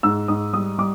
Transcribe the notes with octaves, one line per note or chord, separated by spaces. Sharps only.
G#2 E6
G#2 D#6
G3 D#6
G3 D6